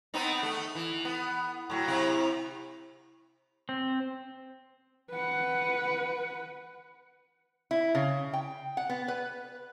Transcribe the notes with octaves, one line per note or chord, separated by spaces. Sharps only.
B3 C4 D#4
A3
E3
B3
A2 F#3
C3 E4
C4
B4 F#5
E4
C#3
G5
F#5
B3
B4